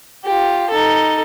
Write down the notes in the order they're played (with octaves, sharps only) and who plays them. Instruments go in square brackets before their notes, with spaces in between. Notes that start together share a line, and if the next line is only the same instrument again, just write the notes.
[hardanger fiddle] F4 G4
D#4 A4